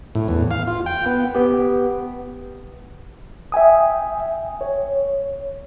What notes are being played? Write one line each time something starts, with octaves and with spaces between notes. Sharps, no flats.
A2
E2
F5
F4
G5
B3
B3 G4
E5 G5 G#5 D#6
C#5